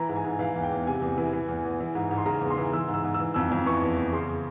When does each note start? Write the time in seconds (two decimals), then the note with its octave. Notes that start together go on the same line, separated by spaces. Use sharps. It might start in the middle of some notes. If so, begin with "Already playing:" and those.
Already playing: E3 A#5
0.09 G#2
0.16 G#5
0.24 G#2
0.39 E3 F5
0.56 E2
0.63 G5
0.71 E2
0.87 C3 G#5
1.02 E2
1.18 E3
1.33 E3
1.48 E2
1.65 E2
1.80 E3
1.95 G#2
2.11 G#2
2.18 C6
2.26 C#3 A#5
2.41 E2
2.50 C6
2.57 E3
2.73 E3 E6
2.88 G#2
2.94 E6
3.04 G#2
3.14 E6
3.20 E3
3.34 F2 E6
3.51 F2
3.66 E3 C#6
3.81 E2
3.97 E2
4.12 C#3 C6